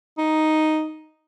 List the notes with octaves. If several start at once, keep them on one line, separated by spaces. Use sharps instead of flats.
D#4